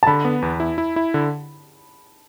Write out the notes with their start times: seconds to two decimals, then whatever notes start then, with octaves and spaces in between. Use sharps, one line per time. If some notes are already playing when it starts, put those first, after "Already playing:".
0.03 A5
0.07 D3 B5
0.25 B3
0.42 E2
0.60 E4
0.78 E4
0.96 E4
1.14 D3